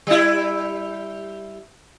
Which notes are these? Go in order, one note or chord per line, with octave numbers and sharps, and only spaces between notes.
G3 E4